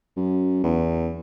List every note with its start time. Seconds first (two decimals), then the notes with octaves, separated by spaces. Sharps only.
0.17 F#2
0.64 E2